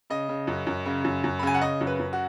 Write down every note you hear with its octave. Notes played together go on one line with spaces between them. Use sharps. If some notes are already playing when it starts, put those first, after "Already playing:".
C#3 D#5
C#3
F#2
F#2
C#3
F#2
F#2
B5
C#3 G#5
F#5
C#3 D#5
F#2
B4
F#2
F#4